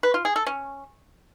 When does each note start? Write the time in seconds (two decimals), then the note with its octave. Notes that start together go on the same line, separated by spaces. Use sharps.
0.03 B4
0.14 F4
0.25 G#4
0.36 A4
0.46 C#4